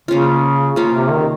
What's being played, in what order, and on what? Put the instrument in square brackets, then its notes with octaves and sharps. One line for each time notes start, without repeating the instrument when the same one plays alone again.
[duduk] C#3 [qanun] A#3 C#4 F4
[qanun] A#3 C#4 F4
[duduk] C3
D#3